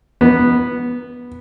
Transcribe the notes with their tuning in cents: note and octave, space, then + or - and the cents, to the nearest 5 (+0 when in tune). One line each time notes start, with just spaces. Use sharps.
B3 -10